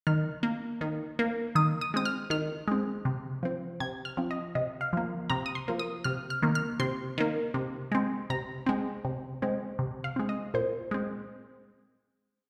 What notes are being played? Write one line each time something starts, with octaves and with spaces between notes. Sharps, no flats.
D#3 F6
A#3
D#3
A#3
D#3 D#6
D#6
G#3 C4 D#6
F6
D#3 F6
G#3 C4
C3
F3 C4
C3 G#6
F6
F3 C4
D#5
C3 D#5
F5
F3 A#3
C3 A#5
D#6
C6
F3 A#3
D#6
C3 F6
F6
D#3 A#3
F6
C3 C6
D#3 A#3
C3
G#3 C4
C3 A#5
G#3 C4
C3
G#3 C4
C3
F5
G#3 C4
D#5
A#2 C5
G#3 C4